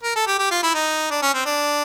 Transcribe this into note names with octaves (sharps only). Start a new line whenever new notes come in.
A#4
A4
G4
G4
F4
E4
D#4
D4
C#4
C4
D4